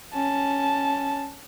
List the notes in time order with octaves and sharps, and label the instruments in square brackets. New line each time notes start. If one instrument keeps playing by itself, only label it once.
[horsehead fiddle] C#4 A5